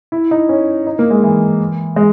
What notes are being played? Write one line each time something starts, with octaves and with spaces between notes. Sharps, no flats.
E4
D#4
C#4
D#4
A#3
G#3
E3
G#3